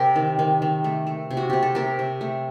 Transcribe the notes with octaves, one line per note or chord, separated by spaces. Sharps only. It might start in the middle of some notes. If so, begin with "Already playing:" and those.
Already playing: C3 G4 A#4
D#3
D#3
D#3
A3
A3
C3
F#4
C3 G4
A4
A3 G4 A#4
C3
A3